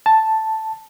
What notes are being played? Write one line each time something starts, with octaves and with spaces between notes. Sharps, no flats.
A5